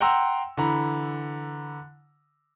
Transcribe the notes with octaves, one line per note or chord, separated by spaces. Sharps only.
F#5 G5 A#5 C6 E6
D3 E3 A#5 B5